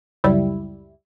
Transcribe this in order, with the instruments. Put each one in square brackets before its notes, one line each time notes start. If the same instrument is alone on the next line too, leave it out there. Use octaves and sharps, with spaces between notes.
[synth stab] C#2 F#2 G3 E4